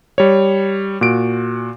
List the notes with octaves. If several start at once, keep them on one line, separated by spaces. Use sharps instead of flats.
G3 C#5
A#2 F#4 D7